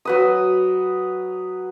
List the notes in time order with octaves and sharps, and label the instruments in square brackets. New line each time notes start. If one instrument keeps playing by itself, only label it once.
[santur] F#3 B4 D#6